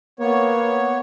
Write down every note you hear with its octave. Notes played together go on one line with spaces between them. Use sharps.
A#3 B3 C#5